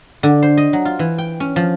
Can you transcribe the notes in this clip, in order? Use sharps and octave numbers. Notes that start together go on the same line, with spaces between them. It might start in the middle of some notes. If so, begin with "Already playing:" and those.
D3
C5
D#5
F#3
F4
E3
G5
C#4
F3